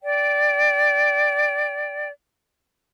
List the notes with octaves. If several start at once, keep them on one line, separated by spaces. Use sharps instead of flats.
D5 G5